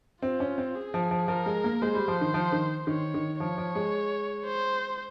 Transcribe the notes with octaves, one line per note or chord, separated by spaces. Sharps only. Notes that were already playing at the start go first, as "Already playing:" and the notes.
C4 F4
C#4
C4
G#4
F3
F3
F3 A#4
G#3
A#3
G#3 C5
G3
F3
D#3
F3
D#3
D#3 C#5
D#3
F3 C#5
F3
G#3
C5